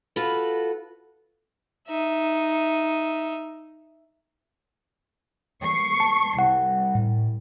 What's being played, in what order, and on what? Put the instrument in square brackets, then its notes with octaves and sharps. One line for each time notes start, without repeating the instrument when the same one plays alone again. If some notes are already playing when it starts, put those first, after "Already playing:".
[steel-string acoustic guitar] F4 F#4 A4 B4
[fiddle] D#4 E5
[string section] C#6 C7 C#7
[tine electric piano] A5
[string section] C2 [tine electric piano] F#5
[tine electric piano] A2